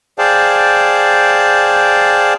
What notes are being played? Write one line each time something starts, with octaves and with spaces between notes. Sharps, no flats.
G#4 C5 D5 F5 G5 A5